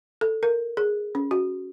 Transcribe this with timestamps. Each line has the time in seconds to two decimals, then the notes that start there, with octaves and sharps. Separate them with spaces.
0.21 A4
0.43 A#4
0.77 G#4
1.15 C#4
1.31 F#4